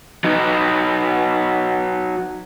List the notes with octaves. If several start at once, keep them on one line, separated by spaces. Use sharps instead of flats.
F#3 D#4